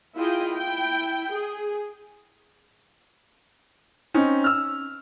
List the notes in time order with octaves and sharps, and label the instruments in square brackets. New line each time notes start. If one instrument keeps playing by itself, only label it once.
[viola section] E4 F4 G#4 D#5 G5
E4 G5
G#4
[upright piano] C4 C#4 D#4
E6 F6